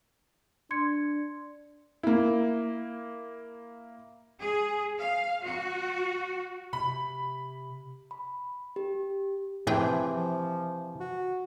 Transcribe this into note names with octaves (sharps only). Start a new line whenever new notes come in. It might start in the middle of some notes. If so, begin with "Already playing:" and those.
D4 C6 G#6 C#7
A#3 E4
G#4
F5
F#4
C3 B5
B5
G4
A2 C3 E3 F3 G#4 G5
F3
F#4